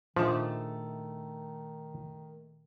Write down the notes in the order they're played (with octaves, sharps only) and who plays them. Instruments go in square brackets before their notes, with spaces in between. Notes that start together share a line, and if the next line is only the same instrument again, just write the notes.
[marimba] A#2 D4 [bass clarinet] D#3 [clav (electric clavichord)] F3 [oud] A3 D#4 G#4